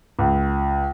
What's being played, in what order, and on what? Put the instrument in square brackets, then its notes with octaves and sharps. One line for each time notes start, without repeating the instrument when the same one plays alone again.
[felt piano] C#2